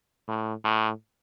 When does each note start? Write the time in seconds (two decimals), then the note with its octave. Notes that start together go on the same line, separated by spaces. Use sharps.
0.28 A2
0.64 A2